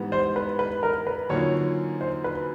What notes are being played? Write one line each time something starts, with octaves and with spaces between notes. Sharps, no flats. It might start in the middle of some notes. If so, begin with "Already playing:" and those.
Already playing: G#2 E3 G3 B3
C5
B4
B4
A#4
B4
F#2 D3 F3 A#3 D#4 C#5
C5
B4